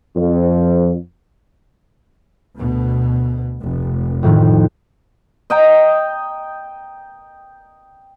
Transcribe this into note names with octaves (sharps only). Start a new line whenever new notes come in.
F2
D2 B2
F1
F2 A2 D#3
D#5 G5 A#5